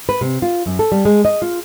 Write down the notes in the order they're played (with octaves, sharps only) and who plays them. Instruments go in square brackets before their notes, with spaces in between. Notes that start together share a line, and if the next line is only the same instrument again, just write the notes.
[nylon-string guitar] B4
C3
F4
F#2
A4
G3
G#3
D#5
F4